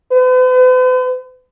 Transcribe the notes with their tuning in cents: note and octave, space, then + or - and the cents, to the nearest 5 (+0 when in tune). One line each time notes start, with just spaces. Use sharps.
B4 +45